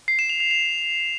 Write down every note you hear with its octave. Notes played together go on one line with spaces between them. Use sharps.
C7
E7
F7
F7
F7